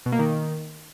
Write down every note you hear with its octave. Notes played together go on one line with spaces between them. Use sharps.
B2
A#3
D#3